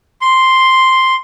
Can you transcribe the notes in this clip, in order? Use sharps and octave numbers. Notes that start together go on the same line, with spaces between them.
C6